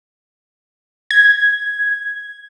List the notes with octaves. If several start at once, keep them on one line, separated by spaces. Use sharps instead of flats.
G#6